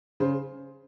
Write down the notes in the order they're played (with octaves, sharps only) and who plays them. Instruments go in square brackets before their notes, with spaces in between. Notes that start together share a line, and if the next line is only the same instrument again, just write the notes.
[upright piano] C#3 C5